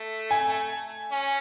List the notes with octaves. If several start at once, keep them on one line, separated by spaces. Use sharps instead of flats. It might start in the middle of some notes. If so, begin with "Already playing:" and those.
Already playing: A3
G#5
C#4